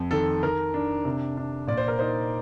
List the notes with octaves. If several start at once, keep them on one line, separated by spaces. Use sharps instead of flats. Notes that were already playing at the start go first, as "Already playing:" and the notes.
Already playing: F2
D#3 A4
D#3 A#4
D4
C3
D4
A#2 D5
C5
A#4
D#4 C5